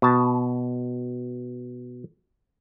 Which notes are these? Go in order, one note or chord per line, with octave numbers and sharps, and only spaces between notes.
B2 A5